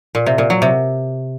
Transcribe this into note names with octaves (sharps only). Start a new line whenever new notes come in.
A#2
C3
A#2
F#3
C3